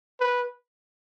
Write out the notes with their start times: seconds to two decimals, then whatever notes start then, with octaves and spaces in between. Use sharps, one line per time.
0.20 B4